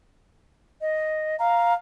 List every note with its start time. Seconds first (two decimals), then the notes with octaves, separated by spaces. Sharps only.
0.81 D#5
1.39 F5 A#5